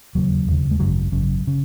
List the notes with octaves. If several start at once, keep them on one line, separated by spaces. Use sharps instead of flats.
E1 D#2 C#3 F#3
E1 D#2 C#3
G#3
G#1 F#2 C#3 F#3
G#1 F#2 C#3
C#3